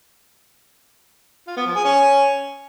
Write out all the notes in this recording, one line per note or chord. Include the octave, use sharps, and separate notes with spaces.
F4
B3
F3
G#4
C#4